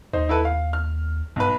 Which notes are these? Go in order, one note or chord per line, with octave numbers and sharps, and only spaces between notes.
D#2 D#4 C5
E4 A4 B4
F5
F6
B1 G2 B4